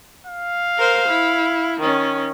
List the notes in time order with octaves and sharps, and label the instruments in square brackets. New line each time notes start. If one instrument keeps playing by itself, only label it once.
[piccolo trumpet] F5
[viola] A#4 C5
E4
D#3 C#4